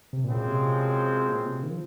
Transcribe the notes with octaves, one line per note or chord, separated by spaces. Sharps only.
C3
F#2 A#2 C#3 F3 G#3 C4
A#2
C3
A#2
C3
D#3
F3